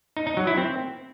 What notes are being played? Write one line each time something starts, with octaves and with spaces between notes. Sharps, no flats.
D#4
D#4
F#3
E4
C4